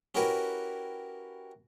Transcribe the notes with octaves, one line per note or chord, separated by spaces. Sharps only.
C#4 E4 F#4 G4 A#4 B4